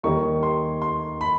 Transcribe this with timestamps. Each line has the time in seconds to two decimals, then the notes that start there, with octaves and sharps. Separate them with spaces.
0.03 D#2 D#3 G3 A#3 D#4 C#6
0.43 C6
0.82 C6
1.21 B5